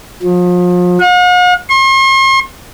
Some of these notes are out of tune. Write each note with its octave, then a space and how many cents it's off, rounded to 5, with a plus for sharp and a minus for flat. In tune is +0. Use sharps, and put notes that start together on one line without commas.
F3 +35
F#5 -45
C6 +45